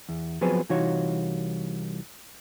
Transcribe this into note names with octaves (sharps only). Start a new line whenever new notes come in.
E2
F3 F#3 B3 C4 G#4 B4
C2 E3 D#4 F4 F#4 C#5